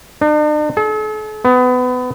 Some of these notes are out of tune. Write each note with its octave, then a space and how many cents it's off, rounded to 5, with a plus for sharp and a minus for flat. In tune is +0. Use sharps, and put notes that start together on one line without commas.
D4 +45
A4 -45
B3 +25